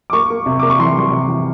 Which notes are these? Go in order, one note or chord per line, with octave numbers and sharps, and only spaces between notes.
D6
A#3 C#6
A#3
C3
A#3 D6
C#6
E3 C6
G3
C3
E3